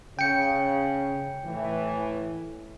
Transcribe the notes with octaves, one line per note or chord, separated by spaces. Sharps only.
C#3 G5 C#7
A2 E3